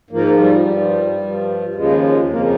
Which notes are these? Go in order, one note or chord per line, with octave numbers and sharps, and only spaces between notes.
G#2 F3 A#3
G3
G2 F3
G2 F3
D#2 C#3 F3 G#3
G#3
F2 C#3 F3 A#3